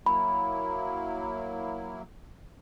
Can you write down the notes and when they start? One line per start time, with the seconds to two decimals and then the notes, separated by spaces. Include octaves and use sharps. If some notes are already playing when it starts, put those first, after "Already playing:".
0.06 F#3 A#3 E4 B5